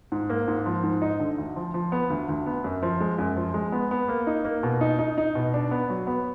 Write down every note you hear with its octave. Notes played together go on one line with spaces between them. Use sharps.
G#2
A#3
G#2
F3
G#2
D#4
D3
D2
F3
F3
B3
D2
D2
B3
F#2
F3
G#3
F#2
F3
G#3
B3
B3
A#3
D#4
A#3
B2
D#4
D#4
D#4
B2
D4
B3
F#3
B3